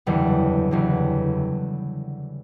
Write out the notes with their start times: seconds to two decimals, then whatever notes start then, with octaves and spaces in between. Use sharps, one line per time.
0.07 F#1 E2 D3 G3
0.71 F#1 E2 D3 G3